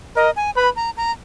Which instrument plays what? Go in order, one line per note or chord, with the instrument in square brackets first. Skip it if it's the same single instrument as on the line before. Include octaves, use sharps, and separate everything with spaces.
[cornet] A#4 [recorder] D#5
[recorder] G#5
[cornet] B4 [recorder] B5
[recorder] A#5
A#5